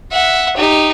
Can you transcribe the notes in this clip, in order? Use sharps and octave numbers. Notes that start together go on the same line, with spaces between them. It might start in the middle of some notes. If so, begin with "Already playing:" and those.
E5 F#5
D#4 G4